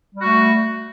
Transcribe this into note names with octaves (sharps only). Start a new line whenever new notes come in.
G3 A3 F#4